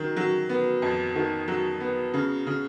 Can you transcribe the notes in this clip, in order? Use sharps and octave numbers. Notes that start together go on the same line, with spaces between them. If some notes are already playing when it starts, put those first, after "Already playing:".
Already playing: D#3 F#3
F#3
B3
F2
D#3
F#3
B3
C#3
C#3